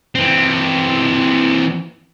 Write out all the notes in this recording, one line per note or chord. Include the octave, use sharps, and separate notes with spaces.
E3 C4